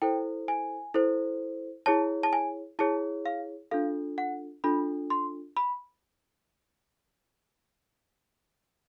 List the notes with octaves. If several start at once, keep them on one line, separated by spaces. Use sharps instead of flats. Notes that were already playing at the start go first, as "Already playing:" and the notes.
E4 A4 C5 G5
G#5
E4 A4 C5
E4 G#4 C#5 A5
A5
G#5
E4 G#4 C#5 A5
F5
D4 F4 A4 F5
F#5
D4 F4 A4 B5
C6
B5